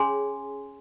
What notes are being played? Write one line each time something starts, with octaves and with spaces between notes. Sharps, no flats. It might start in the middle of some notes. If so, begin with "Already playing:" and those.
Already playing: C#4 G#4 C#5 G#5 C6